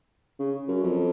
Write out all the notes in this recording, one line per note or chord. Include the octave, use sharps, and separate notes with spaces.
C#3
F#2
F2